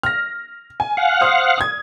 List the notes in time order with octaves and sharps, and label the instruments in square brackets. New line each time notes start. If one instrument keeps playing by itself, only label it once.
[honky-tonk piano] F6 A#6
G#5
[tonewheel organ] F5 F#5
[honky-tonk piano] C5 D#6 F6
D#6 G#6